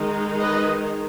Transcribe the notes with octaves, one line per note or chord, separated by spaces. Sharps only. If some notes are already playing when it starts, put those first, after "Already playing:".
Already playing: D#3 G#3 D#4
B4 D#5